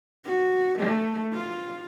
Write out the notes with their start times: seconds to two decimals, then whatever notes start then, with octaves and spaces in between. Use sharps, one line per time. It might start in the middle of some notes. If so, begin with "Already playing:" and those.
0.25 F#4
0.79 A3
1.33 F4